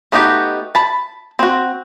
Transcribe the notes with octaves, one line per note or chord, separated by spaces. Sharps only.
A3 B3 D#4 F#4 G4
A5 B5
C4 F#4